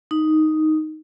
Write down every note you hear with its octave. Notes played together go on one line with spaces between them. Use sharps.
D#4